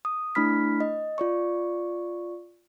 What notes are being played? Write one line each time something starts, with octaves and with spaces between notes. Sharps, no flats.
D#6
A3 D4 E4 B5 F6 B6
D#5
F4 D5 C#6